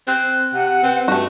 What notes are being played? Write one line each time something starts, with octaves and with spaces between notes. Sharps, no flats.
C4 F#6
C3 F#5
C4 B4
G2 A3 F#4